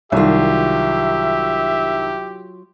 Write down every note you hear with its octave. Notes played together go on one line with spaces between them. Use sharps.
C2 D#3 F#3 F4 G4 E5